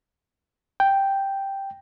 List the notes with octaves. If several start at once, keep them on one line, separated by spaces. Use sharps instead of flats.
G5